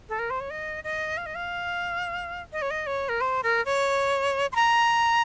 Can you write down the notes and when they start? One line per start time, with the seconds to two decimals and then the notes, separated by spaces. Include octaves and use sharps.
0.09 A4
0.19 A#4
0.30 C5
0.40 C#5
0.50 D#5
0.84 D#5
1.17 F5
1.26 D#5
1.35 F5
2.53 D#5
2.62 C#5
2.71 D#5
2.87 C#5
3.09 A#4
3.21 C5
3.43 A#4
3.65 C#5
4.52 C6
4.55 A#5